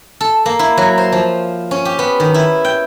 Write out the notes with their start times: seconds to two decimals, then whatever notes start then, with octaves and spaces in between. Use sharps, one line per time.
0.21 A4
0.46 A#3
0.59 E4
0.78 F#3
0.98 C5
1.12 F3
1.71 C#4
1.85 G4
1.99 B3
2.20 D#3
2.34 E4
2.65 G5